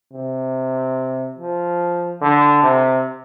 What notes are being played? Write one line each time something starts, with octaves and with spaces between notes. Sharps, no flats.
C3
F3
D3
C3